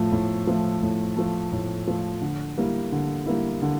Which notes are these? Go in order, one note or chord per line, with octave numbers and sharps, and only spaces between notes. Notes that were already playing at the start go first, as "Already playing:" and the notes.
Already playing: A2 F3 A3
A2
F3 A3
A2
F3 A3
A2
F3 A3
D3
G3 A#3 E4
D3
G3 A#3 E4
D3